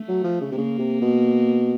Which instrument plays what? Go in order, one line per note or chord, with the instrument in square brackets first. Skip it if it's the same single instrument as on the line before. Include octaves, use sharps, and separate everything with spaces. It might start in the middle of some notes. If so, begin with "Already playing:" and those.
Already playing: [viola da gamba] A3
[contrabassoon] F#3
F3
C#3
C3
[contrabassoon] C#3 [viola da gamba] A#3
[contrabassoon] C3
B2